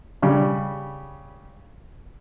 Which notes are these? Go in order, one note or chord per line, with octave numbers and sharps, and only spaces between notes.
C#3 G3